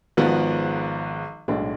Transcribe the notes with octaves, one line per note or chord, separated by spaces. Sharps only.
G#1 G#2 F3 B3 F#4
B1 A2 G#3 D4 F#4